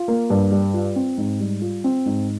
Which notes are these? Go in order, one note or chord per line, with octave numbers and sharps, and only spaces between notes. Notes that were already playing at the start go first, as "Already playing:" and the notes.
Already playing: F4
A#3
G2
G3
F4
C4
G#2
G3
F4
C4
G#2